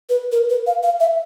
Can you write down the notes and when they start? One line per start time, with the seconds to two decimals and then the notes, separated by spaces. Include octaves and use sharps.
0.10 B4
0.32 A#4
0.50 B4
0.67 F5
0.83 F5
1.00 E5